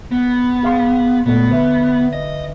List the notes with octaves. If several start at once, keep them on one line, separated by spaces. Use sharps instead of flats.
B3
G#4 F5 C6
A#2 A3 B3
D3 B4 E5
D#5